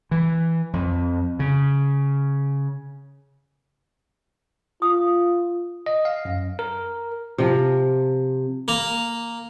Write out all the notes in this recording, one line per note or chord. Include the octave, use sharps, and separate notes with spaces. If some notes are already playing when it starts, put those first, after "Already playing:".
E3
F2
C#3
F4 D#6
D#5
F5
F#2
A#4
C3 F3
A#3 A#5